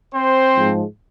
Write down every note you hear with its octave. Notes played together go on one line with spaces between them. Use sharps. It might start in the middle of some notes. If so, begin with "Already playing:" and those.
C4 C5
G#2 F3 G#3